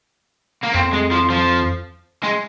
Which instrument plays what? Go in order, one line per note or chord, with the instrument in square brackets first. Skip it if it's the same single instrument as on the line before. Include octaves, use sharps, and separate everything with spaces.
[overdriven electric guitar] A#3
[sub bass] F2 [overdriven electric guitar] C4
[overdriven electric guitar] G#3
F3
F3
G#3